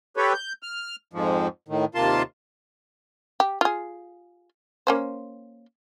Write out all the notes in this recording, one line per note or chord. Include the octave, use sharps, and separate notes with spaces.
G4 A4 B4 C#5
G6
F6
F2 G#2 F3
A2 D#3
D#2 C3 A#3 F4 A5 C6
G4
F4 G#4
A#3 C#4 C5